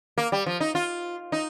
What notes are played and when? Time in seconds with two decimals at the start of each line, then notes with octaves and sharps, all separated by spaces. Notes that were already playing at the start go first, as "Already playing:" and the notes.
0.18 A#3
0.32 G3
0.46 F3
0.60 D#4
0.75 F4
1.32 D#4